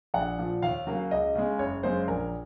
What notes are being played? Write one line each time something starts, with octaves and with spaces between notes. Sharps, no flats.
A#1 F#5
A#2 F3
D#2 F5
C#3 F#3 A#3
C#2 D#5
C#3 G#3
F#1 C#5
F#2 C#3 G#3 C5
A#1 A#4